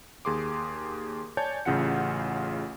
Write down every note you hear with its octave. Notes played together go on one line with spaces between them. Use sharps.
D#2 G#4 C6 D6
C#5 D5 G#5 A5 G6
A1 C#3 F4 F#5 C#7